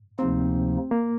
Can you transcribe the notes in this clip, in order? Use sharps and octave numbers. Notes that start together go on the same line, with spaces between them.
D2 C3 F3 A#3 C4 D#4
A#3